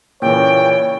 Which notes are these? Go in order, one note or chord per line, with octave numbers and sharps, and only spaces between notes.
A#2 C#3 E3 C#5 G5